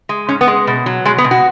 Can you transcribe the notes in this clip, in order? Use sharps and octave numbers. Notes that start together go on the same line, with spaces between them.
G#3
G#2 C#4
B3
G#3
B2
F#3
B2 G#3
B3
B2
F#4